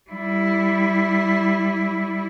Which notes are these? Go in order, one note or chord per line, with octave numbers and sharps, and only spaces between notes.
G3 E4